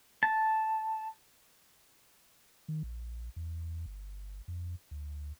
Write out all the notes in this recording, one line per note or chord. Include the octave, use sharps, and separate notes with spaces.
A5
D#3
A#1
E2
G1
F2
D2